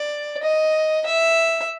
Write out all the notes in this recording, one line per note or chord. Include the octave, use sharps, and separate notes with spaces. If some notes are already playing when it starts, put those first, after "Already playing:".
Already playing: D5
D#5
E5